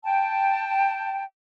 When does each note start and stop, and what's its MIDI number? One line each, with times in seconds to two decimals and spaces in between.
0.04 1.23 79
0.04 1.23 81